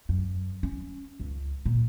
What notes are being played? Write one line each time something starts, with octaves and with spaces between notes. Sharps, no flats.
F#2
C#4
C#2
A#2